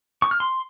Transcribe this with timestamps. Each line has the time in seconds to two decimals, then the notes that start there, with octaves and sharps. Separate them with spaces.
0.22 C#6
0.31 F6
0.40 C6